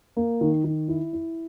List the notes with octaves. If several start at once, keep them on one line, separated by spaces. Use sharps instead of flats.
A#3
D#3
D#3
E4
E4